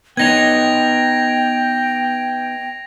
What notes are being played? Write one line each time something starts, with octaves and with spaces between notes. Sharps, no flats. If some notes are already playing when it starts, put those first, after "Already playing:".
B3 D#4 G5 G#6 A#6 F7